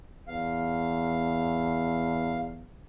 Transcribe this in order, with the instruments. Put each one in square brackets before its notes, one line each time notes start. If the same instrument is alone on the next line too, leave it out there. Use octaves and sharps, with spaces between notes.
[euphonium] E2 [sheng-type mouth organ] F5